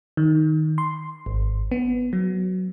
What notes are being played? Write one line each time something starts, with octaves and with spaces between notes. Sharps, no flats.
D#3
C6
G#1
B3
F#3